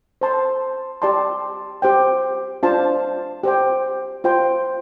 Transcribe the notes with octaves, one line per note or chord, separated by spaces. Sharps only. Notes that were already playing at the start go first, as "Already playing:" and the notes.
C5 A5 C6
G4 D5 A5 C6
G4 C5 G5
D4 F4 C5 F5 A5
G4 C5 G5
F4 C5 G5 C6